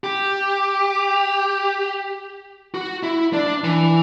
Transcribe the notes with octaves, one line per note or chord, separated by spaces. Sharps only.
G4
F#4
E4
D4
E3